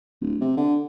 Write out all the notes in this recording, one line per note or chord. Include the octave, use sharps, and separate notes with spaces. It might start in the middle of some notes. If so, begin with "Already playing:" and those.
D1
C3
D3